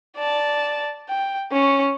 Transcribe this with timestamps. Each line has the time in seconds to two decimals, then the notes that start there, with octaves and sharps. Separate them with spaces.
0.17 D5 A5
1.09 G5
1.52 C#4 C#6